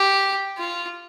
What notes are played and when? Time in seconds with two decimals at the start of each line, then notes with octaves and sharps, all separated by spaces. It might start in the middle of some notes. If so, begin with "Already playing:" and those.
Already playing: G4
0.58 F4